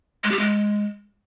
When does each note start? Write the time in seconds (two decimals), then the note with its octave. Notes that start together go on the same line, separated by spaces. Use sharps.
0.24 G#3
0.32 G4
0.39 G#3